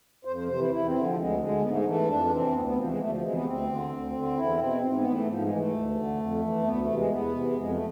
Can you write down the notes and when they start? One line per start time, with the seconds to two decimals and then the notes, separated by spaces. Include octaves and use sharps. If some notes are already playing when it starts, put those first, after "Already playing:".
0.25 F2 C5
0.36 C5
0.47 C3 E3 C5
0.59 E4
0.71 E2 E4
0.86 C4
0.94 D3
1.01 F3
1.16 D2 G#3
1.39 D3 G#3
1.62 G#2 B3
1.70 A3
1.77 G#3
1.85 E3 A3
2.08 F2 D4
2.30 C3 E3 C4
2.53 D2 B3
2.65 B3
2.76 C3 E3 F3
2.87 G#3
2.99 D2 A3
3.10 F3
3.21 C3 E3 G#3
3.33 B3
3.44 D2 C4
3.67 D3
3.90 D2
4.13 D3
4.36 E2 E4
4.58 B2 C4
4.81 G#2 C4
4.96 B3
5.04 E3
5.11 A3
5.27 G#2 F3
5.42 G#3
5.49 E3
5.57 A3
5.72 D2
5.95 D3
6.18 F2
6.41 E3
6.64 D2 B3
6.79 A3
6.86 C3 E3
6.94 G#3
7.09 E2 B3
7.32 C3 E3
7.55 F2 G#3
7.70 A3